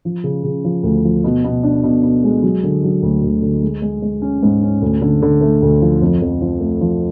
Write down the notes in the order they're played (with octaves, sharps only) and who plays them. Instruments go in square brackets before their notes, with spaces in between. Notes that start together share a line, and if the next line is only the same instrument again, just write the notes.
[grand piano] F3
C#3
C#3
F3
D2
F3
B2
B2
D4
B2
B2
G#3
F#3
D3
F#3
D2
D2
D3
G#3
G#3
G#3
C#4
G#2
C#4
D2
D3
D3
A3
D2
F3
F2
F2
F3
A3
F3